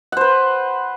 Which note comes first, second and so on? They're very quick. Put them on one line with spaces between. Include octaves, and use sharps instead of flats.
F#5 C5 B4